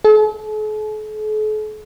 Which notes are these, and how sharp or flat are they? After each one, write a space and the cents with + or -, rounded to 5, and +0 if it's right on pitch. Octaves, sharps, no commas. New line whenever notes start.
A4 -45